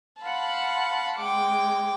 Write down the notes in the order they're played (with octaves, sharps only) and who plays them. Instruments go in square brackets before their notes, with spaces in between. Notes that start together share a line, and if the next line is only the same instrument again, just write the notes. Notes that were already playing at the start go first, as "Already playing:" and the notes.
[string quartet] F5 F#5 C6 [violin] A5 B5
[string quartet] G#3 [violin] G5 D6